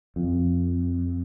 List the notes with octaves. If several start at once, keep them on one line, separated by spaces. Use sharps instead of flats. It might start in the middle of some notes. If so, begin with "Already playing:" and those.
F2